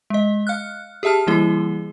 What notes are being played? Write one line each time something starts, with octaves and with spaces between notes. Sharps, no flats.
G#3 D#5
F5 F6 F#6
G4 G#4 E5 A5 F6
E3 G3 A#3 E4 G#4 G7